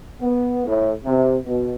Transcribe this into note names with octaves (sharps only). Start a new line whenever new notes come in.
B3
A2
C3
B2